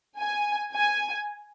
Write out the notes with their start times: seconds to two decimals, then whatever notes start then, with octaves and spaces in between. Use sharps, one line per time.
0.18 G#5
0.73 G#5